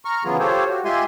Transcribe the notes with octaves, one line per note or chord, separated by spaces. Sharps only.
A#5 C#6 F6
C#3 E3 F#3 B3 F4 G#4
F4 G4 A4 C5 C#5
F#4 G4
G#3 F4 G4 E5 G#5 C6